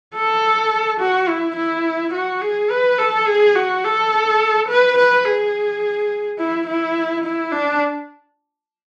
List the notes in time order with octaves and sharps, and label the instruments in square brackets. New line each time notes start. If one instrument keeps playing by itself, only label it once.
[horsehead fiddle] A4
F#4
E4
E4
F#4
G#4
B4
A4
G#4
F#4
A4
B4
B4
G#4
E4
E4
E4
D4